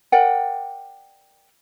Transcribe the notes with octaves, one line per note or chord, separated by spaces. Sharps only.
A#4 D5 F#5 G5